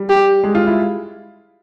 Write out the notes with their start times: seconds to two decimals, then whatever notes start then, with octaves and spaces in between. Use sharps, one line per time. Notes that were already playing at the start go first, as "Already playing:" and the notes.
Already playing: G3
0.10 G4
0.44 G#3
0.55 F4
0.66 E4